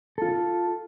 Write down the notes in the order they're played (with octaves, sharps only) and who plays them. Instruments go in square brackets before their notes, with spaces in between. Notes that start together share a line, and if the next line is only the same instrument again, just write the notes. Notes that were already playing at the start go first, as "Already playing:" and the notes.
[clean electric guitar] F4 A4